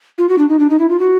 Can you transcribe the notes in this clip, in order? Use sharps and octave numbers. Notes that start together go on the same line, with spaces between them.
F4
F#4
D4
D#4
D4
D#4
E4
F4
F#4